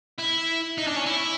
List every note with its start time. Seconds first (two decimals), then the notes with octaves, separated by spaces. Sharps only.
0.19 E4
0.78 D#4
0.87 D4
0.96 C#4
1.06 E4